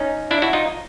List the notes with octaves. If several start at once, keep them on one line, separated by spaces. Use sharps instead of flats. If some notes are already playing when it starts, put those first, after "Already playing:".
Already playing: C#4 D#4
D4 E4
E4 F#4
D#4 F4